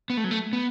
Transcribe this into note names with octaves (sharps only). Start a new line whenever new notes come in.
B3
A3
F#3
A3
B3